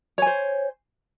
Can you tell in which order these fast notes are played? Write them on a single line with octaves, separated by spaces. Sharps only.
C#5 G#5 C5